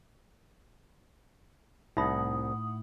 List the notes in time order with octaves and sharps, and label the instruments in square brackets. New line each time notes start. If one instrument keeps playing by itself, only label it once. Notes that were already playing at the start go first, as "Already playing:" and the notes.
[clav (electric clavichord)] C2 [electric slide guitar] A2 F#5 [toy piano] D#4 E5 B5 [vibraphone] D#6